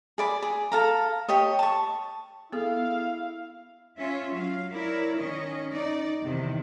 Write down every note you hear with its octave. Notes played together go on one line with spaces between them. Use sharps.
G#4 D5 B5
G#4
A4 F5 A#5
G4 C#5 D#5
A5 C#6
B3 E4 G#4 A4 F5
C#4 F4 E5
F#3 F5
E4 A#4 C#5 D5
D#3 C#4 D#5
D#4 D5
E2 C3 D#3